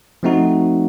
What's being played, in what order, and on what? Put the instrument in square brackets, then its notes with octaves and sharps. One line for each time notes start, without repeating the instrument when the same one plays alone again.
[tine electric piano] F3 A3 C4 D#4 F#4